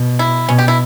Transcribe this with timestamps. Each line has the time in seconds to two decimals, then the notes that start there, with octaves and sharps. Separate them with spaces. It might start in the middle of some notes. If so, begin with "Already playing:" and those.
Already playing: B2
0.19 E4
0.49 B2 C#4
0.58 G4
0.68 E4